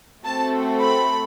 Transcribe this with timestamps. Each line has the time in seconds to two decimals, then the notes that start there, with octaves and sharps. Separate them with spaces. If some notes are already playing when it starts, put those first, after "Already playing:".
0.25 A3 C4 F#4 A4 A5
0.82 B5